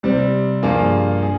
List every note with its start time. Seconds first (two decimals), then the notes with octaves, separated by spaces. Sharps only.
0.03 C3 G3 C4
0.63 G2 F3 A#3 F4 G#4
1.23 G#4